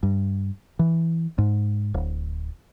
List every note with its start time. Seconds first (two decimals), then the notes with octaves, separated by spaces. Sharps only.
0.03 G2
0.79 E3
1.38 G#2
1.94 D1